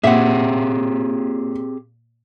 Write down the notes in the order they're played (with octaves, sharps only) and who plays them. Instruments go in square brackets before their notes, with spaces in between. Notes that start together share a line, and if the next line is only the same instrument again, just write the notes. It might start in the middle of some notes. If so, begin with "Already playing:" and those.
[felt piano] A#2 [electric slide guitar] C4 G4 G#4 [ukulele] E5 F#5